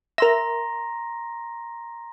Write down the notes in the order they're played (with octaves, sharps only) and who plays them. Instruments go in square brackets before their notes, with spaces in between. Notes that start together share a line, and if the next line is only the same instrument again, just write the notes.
[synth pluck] A#4 E5 [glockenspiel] A#5 C6 A#6